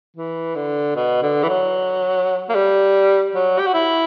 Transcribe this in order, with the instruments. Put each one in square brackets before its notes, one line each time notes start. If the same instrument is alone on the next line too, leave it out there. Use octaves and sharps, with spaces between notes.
[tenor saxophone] E3
D3
B2
D3
E3
F#3
A#3
G3
F#3
G4
F#4
E4